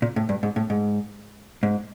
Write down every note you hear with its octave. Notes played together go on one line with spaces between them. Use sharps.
A#2
A2
G2
G#2
A2
G#2
G#2